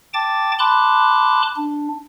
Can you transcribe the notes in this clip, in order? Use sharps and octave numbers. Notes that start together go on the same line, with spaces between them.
G5 A5 D6 A6
A5 B5 C6 D6 F#6
D4